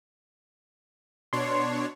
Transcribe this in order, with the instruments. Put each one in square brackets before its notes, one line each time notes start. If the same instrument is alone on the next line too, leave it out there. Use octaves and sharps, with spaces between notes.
[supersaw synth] B2 D4 C#5 [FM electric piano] C6